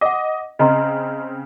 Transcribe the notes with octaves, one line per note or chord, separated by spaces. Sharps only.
D#5 F#5 D6
C#3 C4 D#5 A#5 C6